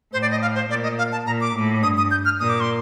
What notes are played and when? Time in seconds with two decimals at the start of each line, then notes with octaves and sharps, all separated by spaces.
0.13 A2 C5
0.22 D5
0.31 D#5
0.42 F5
0.55 C5
0.70 A#2 D5
0.83 D#5
0.98 F5
1.12 A5
1.26 A#2 A#5
1.41 D6
1.55 A2
1.83 G2 D#6
1.98 D#6
2.11 G6
2.25 F6
2.40 A#2 D#6
2.49 D6
2.60 C6